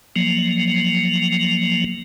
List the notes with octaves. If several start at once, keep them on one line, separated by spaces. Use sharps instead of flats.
F3 F#3 A#3